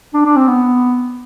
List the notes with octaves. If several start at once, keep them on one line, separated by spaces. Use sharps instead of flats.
D4
D4
C4
B3